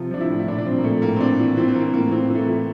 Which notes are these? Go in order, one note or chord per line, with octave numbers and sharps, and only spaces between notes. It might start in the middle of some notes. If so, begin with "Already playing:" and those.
Already playing: C3 F3 F4
F3 D4
E4
A2
E4
A#2 D4
D4
F3 C4
A#3
A#2 A3
A2 A#3
C4
E3 D4
E3
E3 C4
C4
E3 A#3
A2 A#3
E3 C4
E3 A3
A#3
E3